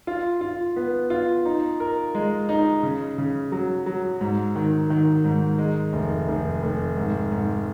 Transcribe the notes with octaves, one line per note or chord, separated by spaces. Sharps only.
F4
F4
B3
F4
D#4
A#4
G#3
D#4
C#3
C#3
F#3
F#3
G#2
D#3
D#3
G#2
G#3
F1
F1
F1
G#2
G#2